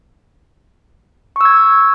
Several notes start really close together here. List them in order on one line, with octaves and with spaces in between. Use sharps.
C#6 E6 G#6